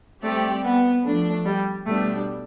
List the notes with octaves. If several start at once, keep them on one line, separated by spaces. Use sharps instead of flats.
G3 A3 C4 G4 D5
B3
F3 A3 D4
G3
B2 G3 A3 B3 D4 G4